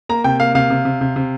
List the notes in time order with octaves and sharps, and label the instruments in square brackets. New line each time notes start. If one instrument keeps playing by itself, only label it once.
[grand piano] A#3 A#5
C3 G5
A#3 F5
C3 F5
C3
C3
C3
C3